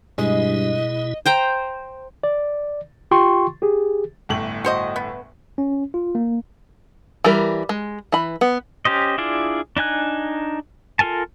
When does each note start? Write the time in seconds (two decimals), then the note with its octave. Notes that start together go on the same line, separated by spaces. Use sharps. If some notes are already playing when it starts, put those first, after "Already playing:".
0.18 G2 B2 G#3 E4 D#5
1.26 C5 G5 A#5
2.24 D5
3.11 F4 G4 G5 C6 C#6
3.62 G4 G#4
4.29 G1 A2 F#7
4.64 F#4 C5 D#5
4.96 B3
5.58 C#4
5.94 F4
6.15 A#3
7.24 E3 G3 A#4
7.69 G#3
8.12 E3 B5
8.41 B3
8.85 C#4 G4 C5 D#5
9.18 D4 E4 F4 G#4 D5
9.77 D4 D#4 G#5 F#6
10.99 F4 A4 A#4 G#5 A5